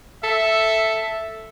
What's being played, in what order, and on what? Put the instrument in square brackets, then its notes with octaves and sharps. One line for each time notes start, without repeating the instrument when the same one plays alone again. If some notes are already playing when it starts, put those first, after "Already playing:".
[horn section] A4 E5